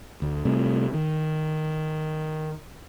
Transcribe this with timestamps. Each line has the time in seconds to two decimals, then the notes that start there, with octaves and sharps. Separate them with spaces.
0.22 D2
0.45 C3 G3 A3 C4
0.94 D#3